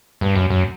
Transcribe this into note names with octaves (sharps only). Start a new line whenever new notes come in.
G2
F#2
F#2